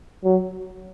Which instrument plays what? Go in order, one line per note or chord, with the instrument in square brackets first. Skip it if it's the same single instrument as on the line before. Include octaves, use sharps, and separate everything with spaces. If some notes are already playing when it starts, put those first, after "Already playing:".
[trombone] F#3